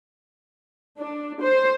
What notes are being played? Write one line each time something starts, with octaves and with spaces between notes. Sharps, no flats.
D4
C5